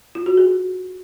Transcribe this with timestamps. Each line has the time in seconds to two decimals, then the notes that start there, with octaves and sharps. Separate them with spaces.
0.15 F4
0.26 F#4
0.37 G#4